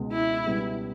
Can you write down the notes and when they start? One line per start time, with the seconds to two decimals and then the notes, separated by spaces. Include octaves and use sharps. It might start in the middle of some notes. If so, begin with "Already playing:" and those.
Already playing: C#2 B2 G#3
0.12 E4
0.46 C#2 B2 G3 B3